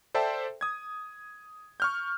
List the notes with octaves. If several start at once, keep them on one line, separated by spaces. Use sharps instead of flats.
A4 C5 D5 E5 G5 A5
D#6 G#6
C#6 F6 G6